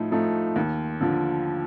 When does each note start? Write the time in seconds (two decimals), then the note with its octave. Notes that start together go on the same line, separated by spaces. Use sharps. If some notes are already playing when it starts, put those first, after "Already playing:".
Already playing: A2 F3 A3 D#4
0.11 F3 A3 D#4
0.56 D#2
1.01 D3 F3